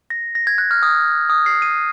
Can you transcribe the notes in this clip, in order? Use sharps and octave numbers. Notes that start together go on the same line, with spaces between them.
A#6
A#6
G#6
F#6
F6
D#6
D#6
C7
D#7